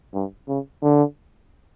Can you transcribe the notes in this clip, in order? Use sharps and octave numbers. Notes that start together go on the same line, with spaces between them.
G2
C#3
D3